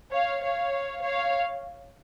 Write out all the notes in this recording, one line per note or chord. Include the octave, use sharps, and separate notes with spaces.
C#5 F5
C#5 F5
C#5 F5